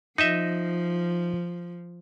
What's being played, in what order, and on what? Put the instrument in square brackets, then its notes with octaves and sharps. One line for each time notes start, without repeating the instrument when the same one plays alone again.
[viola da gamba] F3 [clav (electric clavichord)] D#4 D#5 E5